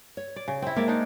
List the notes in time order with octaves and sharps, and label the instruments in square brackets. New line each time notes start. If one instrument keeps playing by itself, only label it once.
[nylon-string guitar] C#5
[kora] D5
C#3
[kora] C4 E4 [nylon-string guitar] G5
[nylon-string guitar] G#3 [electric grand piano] A#3 [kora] A#4 D5 E5
[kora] D4 D#4 D5